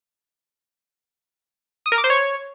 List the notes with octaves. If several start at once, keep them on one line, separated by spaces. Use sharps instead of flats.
D#6
A#4
D6
C5
C#5